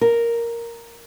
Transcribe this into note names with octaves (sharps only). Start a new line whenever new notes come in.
A#4